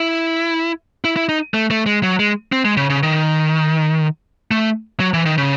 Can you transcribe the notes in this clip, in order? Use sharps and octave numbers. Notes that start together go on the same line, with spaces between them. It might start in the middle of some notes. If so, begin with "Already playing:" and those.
Already playing: E4
E4
E4
D#4
A3
A3
G#3
F#3
G#3
C4
G#3
C#3
C#3
D#3
A3
F#3
E3
D#3
C#3